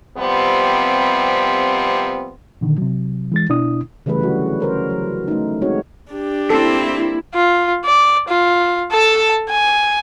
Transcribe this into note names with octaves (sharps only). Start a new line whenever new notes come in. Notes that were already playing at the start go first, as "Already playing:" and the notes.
C3 F3 G3 B3 C4
A#2 D3 D#3
C3 F#3
E3 G#3 A6
B2 D4 E4 D#6
C#3 E3 G3 A3 B4
D3 F#3 F#4
C#4 A#4 C5
F#3
A3 D#4
G#3 C4 D#4 F#4 C#5
D4 G4
A#3 C4 E4 A4
F4
D5
F4
A4 A5
G#5